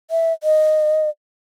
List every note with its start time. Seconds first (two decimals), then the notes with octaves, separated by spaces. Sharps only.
0.11 E5
0.43 D#5